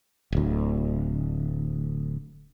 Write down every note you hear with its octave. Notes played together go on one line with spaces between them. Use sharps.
D1 D2